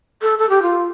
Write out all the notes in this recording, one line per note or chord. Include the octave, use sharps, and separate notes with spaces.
A4
A4
G4
F4